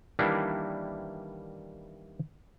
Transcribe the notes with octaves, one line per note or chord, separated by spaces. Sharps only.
D#3 E3 G3 A#3 D4 E4